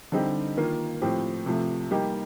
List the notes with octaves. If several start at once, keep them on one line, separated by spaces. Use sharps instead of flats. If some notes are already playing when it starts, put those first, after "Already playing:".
D3 G3 C4 D#4 G4
D#3 A#3 F4
A2 F3 C4 G4
C3 F3 A3
G3 A#3 D#4 G4